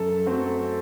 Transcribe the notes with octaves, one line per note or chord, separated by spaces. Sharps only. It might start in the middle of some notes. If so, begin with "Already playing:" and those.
Already playing: F#2 A4
F#3 A3 C4